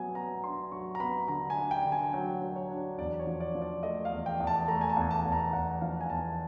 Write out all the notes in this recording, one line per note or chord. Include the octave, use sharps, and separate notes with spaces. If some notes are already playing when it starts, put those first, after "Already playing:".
Already playing: F#3 B3 G#5
B3 A#5
D4 C6
F#3 C#6
A#5
B3 B5
D3 A#5
G#5
D4
G5
D3
G#5
F#3 G5
F#3
C#5
D4
E2 D5
C#5
F3
D5
F3
D5
A3 D#5
F5
E2
G5
E2
A5
A3 A#5
G#5
A5
E2 G#5
A5
E2
A#5
E2 F#5
F3 F5
G#5
E2 A5